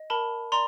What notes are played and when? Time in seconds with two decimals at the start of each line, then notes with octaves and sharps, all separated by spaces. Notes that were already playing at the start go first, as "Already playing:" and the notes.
Already playing: D#5
0.10 A#4 A5 B5
0.52 D5 A#5 C6